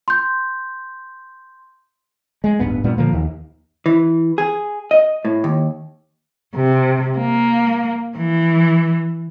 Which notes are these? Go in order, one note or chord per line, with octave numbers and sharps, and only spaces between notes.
C6 G6
G#3
D1 G#1 G2 B3
G2 A#2 G3 B3
A#2 D3 F3 A#3
D#2
E3
G#4
D#5
A2
D#2
C3
A#3
E3